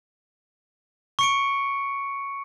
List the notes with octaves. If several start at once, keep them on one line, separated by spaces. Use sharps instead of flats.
C#6 C#7 D7